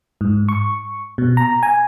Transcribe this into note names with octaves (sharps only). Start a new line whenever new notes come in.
G#2
C#6
B2
A#5
G#5